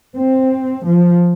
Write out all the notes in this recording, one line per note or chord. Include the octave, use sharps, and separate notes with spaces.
C4
F3